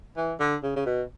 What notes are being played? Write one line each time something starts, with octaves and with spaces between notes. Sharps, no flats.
E3
D3
C#3
C#3
B2